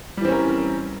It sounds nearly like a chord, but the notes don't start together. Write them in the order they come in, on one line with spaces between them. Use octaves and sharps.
G3 E3 C4 C#4 A#4